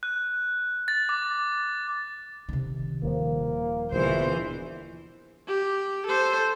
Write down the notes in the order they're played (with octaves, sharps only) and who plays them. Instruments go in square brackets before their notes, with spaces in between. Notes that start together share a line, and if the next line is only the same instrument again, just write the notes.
[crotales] F#6
A6
D6
[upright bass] C3 D#3
[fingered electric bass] D#1 F3 [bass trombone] A#3
[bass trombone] A#1 [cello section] B2 E3 C5 [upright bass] D3
[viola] G4
A4 C5